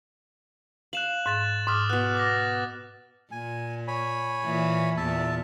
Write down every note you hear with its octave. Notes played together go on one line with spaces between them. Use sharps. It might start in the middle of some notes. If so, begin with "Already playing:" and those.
F5 F#6 E7 F#7
G#2 F#6 A6 E7
G#2 D6 D#6 F6
B2 B3 F#6
D6 A6 A#6
A#2 G#5
C#5 G#5 B5
A#2 E3
E2 A#2 E5 A5